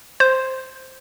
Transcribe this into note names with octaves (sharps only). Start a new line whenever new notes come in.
C5